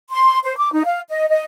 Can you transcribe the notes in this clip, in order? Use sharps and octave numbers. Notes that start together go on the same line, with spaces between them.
C6
C5
D6
D#4
F5
D#5
D#5